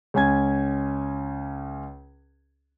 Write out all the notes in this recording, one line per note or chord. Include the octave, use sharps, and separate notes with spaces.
C#2 C#4 G#5 G#6